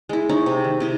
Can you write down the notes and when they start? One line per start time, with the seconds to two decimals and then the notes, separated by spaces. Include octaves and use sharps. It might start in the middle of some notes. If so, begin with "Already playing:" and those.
0.09 G#3 E4
0.29 D#4 E4 C#5
0.46 C3
0.64 D#3
0.80 C3 E4 D#5